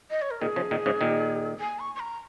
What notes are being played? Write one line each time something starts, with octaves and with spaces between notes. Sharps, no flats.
D#5
C#5
A#4
A#2 D#3 G#4
C#3 F3
A#2 D#3
G#2 C#3
A#2 D#3
G#5
C#6
C#6
A#5